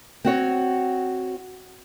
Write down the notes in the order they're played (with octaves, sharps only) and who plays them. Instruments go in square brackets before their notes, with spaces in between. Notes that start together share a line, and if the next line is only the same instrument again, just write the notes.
[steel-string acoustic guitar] C4 F#4 C#5